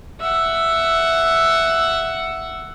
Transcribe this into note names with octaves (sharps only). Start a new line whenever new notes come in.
E5 F#5